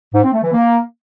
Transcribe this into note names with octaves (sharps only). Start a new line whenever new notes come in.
G#2
C4
A3
E3
A#3